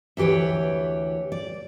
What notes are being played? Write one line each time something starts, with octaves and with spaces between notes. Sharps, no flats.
D2 E3 G4 B4 C#5
D5